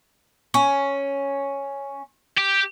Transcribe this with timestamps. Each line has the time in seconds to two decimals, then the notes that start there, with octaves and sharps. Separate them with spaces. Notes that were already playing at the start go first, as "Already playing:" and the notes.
0.54 C#4
2.38 G4